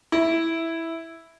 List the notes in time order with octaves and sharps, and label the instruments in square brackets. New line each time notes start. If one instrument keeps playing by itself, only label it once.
[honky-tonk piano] E4